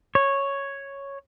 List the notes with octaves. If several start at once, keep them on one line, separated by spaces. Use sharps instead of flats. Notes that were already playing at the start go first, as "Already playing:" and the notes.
C#5